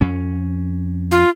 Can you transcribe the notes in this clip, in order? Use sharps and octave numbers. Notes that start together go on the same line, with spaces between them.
F2 C#4
F4